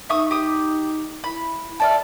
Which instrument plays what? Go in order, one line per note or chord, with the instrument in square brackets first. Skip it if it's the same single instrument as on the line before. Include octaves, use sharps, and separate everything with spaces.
[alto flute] D#4 [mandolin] E5 C#6 D#6
[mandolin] G4 D#6
[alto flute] E4 [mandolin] B5
[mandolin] A4 D5 F6 [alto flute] E5